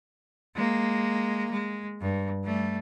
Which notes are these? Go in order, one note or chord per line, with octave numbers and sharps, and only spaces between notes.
G#3 A#3
G#3
G2
G3 A3